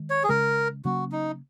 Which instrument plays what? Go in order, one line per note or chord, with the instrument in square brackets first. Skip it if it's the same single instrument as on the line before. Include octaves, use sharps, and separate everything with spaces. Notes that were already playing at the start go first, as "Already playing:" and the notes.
Already playing: [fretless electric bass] D#3 G#3
[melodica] C#5
G#4
[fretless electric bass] C#3 G#3 C#4 [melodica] A#4
[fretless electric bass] C#3 F#3 A#3 C#4 [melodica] F#4
[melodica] D#4